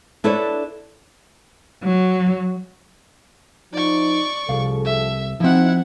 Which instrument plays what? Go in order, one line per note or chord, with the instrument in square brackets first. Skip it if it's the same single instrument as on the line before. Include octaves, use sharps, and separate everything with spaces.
[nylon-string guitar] D4 E4 A4 B4 C#5 D5
[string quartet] F#3
[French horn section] F3 D#4 [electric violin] D5 C#6
[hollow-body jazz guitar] C2 F5 [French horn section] F3 G#4 A4
[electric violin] E5
[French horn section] C3 D#4 [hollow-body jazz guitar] F3 C4 [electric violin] E4 F#5